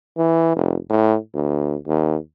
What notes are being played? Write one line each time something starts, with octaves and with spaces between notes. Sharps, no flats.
E3
F1
A2
D2
D#2